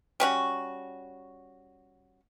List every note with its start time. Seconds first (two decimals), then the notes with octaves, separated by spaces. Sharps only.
0.20 G3 C#4 F#4